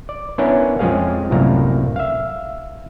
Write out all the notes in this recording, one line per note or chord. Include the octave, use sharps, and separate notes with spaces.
D5
B3 C#4 D4 E4 A#4 C#5
F2 F3 G#3 C#4 G#4 F5
C2 F#2 A2 A#3 A#5
E5 F5